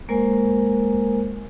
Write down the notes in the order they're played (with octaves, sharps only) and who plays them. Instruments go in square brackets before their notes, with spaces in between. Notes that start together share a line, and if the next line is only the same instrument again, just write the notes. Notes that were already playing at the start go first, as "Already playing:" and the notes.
[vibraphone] G#3 A#3 A#4 C5 G#5